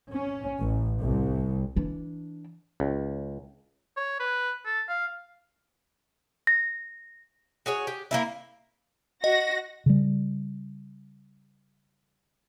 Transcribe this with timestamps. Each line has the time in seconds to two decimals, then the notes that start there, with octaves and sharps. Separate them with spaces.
0.12 C#4
0.60 A1
1.02 C2
1.76 E3 D4
2.80 C#2
3.97 C#5
4.20 B4
4.65 A4
4.89 F5
6.47 A#6
7.66 F#4 G#4 C#5
7.87 G4
8.11 A#3 C#4 E4
9.24 F#4 D#5 A#6
9.86 C#3 G3